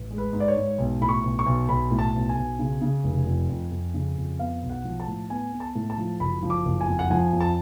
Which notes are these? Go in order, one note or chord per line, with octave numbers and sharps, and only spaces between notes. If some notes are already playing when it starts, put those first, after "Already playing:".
Already playing: A1
G#3
B4
G#2
D5
C#5
G#2
B1
A2 B5
C#6
B1
C#6
B1
B1 B5
A2
A5
B1
G#5
B1
C#3
C#3
F1
F2
F2
F2
C#3
F2
B3 F5
B1
F#5
F3
A5
A2
B3 G#5
B3
A5
A2
A5
F3
F#1 B5
F3
D6
F#1
G#5
F2
F#5
F3 G#5
F2
A5